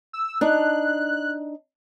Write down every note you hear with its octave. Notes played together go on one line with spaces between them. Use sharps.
E6
D4 D#4 F#6